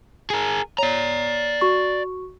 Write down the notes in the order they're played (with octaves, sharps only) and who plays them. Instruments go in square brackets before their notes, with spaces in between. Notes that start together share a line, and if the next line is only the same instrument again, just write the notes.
[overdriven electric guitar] G#4 A#4
[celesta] C#5 [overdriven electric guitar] D5 A#5
[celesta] F#4 C#6